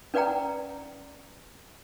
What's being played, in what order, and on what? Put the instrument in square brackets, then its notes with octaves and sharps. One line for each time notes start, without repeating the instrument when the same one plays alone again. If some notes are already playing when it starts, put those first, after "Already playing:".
[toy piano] C#4 B4 D5 F#5 G5 A#5